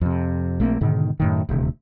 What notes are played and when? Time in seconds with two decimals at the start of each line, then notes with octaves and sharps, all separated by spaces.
0.01 F2 C3
0.60 A#1 A3 A#3 C4
0.81 G#2 B2 D3 D#3
1.20 F#2 A2 D#3
1.49 D#1 D2 C3